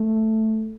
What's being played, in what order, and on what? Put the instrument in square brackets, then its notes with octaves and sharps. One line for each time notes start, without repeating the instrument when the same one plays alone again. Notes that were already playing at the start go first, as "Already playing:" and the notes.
Already playing: [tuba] A3